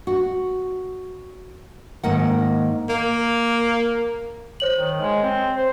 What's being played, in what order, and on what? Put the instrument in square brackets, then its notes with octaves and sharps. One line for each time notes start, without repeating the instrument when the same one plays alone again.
[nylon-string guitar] F#4
G#2 D#3 A#3 F#5
[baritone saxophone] A#3
[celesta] C5 C#5 F#7
[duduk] D#3
G#3
C4
C5